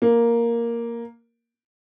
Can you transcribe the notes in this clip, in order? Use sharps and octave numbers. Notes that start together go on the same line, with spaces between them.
A#3